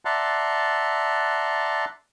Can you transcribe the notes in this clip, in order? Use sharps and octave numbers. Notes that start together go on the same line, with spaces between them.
D5 E5 F#5 A5 A#5 C6